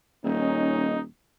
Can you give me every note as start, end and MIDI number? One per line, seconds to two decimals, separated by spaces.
0.24 1.05 27
0.24 0.98 61
0.24 0.98 63